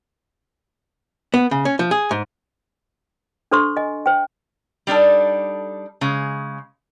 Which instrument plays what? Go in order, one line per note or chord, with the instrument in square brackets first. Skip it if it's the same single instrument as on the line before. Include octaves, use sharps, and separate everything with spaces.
[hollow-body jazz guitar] B3
C#3
C#4
F3
G#4
G#2
[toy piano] D4 A4 C5 C6 C#6
D#5 G#5
C5 G5
[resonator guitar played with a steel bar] G3 D4 D#4 A4
C#3 G#3